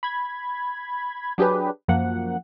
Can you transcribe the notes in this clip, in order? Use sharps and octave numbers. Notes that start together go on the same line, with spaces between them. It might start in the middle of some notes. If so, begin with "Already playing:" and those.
B5 G#6
F#3 D4 G4 G#4 B4
F#2 F3 A#3 F#5